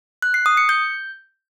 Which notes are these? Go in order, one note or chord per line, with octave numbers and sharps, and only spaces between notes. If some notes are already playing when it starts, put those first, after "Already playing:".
F#6
C7
D#6
C#7
G6